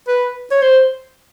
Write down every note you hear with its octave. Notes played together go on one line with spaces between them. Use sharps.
B4
C#5
C5